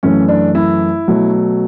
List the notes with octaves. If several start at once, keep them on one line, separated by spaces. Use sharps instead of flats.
F#2 E3 A3 C#4
D4
E4
B2 F#3 A3